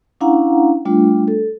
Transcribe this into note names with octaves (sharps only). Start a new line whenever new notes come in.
C#4 D4 E4 F5 F#5 A#5
G3 A3 D4 F4
A4